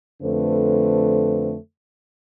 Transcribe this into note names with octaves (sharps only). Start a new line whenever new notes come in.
F2 D3 A3 B4 C5